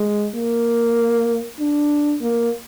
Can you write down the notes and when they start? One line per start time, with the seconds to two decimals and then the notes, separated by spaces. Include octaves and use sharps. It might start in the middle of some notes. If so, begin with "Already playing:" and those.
Already playing: G#3
0.35 A#3
1.59 D4
2.21 A#3